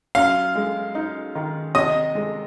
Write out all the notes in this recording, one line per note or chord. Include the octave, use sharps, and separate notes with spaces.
F#2 F5 F6
G#3
D#4
D#3
C3 D#5 D#6
G#3